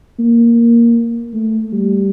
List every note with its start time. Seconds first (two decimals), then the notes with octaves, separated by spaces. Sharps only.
0.19 A#3
1.34 A3
1.73 G3